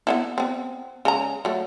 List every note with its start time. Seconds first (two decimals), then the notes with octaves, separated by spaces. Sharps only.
0.07 B3 D#4 E4
0.38 B3 C4
1.05 C#3 G#3 A#5
1.45 F#3 A3